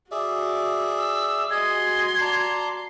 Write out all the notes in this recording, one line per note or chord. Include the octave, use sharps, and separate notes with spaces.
F#4 G#4 D5 E5
E6
F#4 G#4 D#5 C6 G#6
D5 A5 A#5